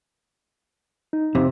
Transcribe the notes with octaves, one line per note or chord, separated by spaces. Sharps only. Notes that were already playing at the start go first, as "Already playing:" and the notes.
D#4
F2 C3